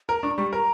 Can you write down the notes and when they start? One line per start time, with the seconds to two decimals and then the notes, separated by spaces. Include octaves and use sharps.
0.09 A#4 A#5
0.23 D4 C#6
0.37 G3 C#6
0.53 A#4 A#5